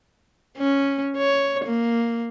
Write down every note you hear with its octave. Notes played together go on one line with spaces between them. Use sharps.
C#4
C#5
A#3